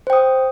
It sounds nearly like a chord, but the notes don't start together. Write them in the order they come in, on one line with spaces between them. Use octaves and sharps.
C5 G5 D#6